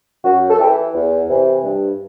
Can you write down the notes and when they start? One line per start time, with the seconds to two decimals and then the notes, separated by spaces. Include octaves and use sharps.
0.24 F#2 F#4
0.49 A4
0.59 E3 G4
0.93 E2
1.29 C3 E3
1.63 G2